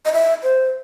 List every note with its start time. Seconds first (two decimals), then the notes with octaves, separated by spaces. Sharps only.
0.05 D#5
0.13 E5
0.43 C5